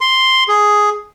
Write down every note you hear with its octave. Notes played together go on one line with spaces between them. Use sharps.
C6
G#4